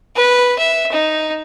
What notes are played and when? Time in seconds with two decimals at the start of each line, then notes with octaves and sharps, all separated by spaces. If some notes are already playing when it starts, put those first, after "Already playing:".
0.16 B4
0.59 E5
0.92 D#4